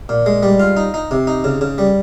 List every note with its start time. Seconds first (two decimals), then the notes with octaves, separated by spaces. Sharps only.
0.09 A#2
0.26 G#3
0.43 G3
0.60 F4
0.77 D#4
0.94 D#4
1.11 C3
1.27 D#4
1.44 C#3
1.61 C#3
1.78 G3